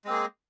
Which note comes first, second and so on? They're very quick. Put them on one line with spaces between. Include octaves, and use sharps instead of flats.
G#3 C4 A#3 G#4